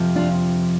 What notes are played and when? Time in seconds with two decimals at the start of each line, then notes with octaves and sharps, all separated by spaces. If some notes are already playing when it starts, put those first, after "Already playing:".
Already playing: F2 C3 F3
0.16 D4 F4